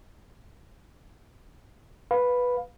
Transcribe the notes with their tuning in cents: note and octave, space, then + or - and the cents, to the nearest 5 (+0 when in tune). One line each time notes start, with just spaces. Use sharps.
B4 -5 F5 +15 B5 +0